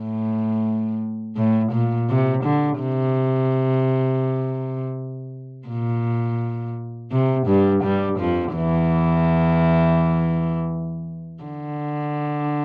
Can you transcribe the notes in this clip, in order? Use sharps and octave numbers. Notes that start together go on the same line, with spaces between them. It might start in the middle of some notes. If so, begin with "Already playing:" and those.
Already playing: A2
A2
A#2
C3
D3
C3
A#2
C3
G2 G3
G2 G3
F2 F3
E2 E3
D3